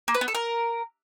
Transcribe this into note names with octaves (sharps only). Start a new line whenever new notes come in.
A#3
B4
B3
A4
A#4